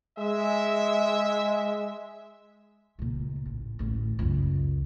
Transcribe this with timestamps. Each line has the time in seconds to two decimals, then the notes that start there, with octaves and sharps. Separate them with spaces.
0.18 G#3 E5
2.99 C#2 A#2
3.45 A1
3.79 A1 D2
4.19 C#2 F#2